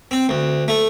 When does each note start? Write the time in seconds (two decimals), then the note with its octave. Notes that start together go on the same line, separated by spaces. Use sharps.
0.11 C4
0.29 D2
0.68 A3